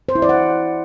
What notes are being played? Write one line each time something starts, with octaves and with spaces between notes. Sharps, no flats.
C5
E4
D5
F#5